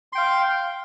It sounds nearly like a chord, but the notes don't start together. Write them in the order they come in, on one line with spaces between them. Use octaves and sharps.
C6 G5 F5